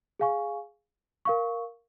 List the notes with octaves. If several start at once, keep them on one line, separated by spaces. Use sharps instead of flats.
G#4 F5 G#5 C#6
A#4 F5 C#6